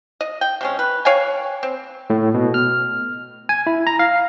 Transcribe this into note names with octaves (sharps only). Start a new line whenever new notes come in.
D#5
G5
C3 G#3 C#4
B4
C#5 F5 G5 G#5
C4
A2
B2
F6
G#5
E4
A#5
F5